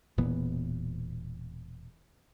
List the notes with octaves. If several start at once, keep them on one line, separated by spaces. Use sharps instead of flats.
E1 A#2 E3 B3